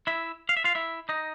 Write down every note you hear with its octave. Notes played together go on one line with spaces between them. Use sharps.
E4 E5
F5
E5
F4 F5
E4 E5
D#4 D#5